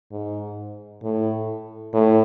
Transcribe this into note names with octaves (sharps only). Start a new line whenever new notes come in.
G#2
A2
A2